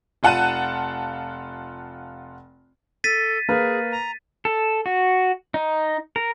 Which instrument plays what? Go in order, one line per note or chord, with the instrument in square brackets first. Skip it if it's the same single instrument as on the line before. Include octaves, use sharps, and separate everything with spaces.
[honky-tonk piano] F1 F4 F#5 A5 F#6 D#7
[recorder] A4 [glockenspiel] A6 B6 D#7
[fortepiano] A#3 A#4 B4 [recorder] G#4
[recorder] A#5
[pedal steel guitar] A4
F#4
D#4
A#4